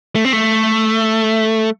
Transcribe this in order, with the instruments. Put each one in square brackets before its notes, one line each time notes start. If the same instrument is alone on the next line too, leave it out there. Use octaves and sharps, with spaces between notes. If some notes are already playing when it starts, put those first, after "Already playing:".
[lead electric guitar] A3
C4
A3